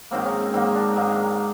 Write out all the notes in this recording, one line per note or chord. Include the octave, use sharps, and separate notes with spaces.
G#2 D#3 F#3 A#3 C4
C#4
C4
G#2 D#3 F#3 A#3 C4
D4
G#2 D#3 F#3 A#3